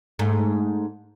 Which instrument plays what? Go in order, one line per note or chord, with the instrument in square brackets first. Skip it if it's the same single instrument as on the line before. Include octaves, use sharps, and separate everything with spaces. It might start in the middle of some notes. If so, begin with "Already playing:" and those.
[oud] G#2 A3